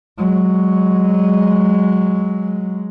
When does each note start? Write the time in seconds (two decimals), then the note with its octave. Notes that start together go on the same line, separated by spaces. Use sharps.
0.18 F#3 G#3